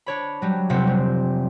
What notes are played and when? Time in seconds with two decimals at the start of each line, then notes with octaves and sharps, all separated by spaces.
0.06 D4 C#5 B5
0.42 F#3 G3
0.69 F1 C3 C4 F#5
0.87 G3